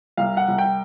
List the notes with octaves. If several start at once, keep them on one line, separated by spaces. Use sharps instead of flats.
C2 F5
F#5
C2
G5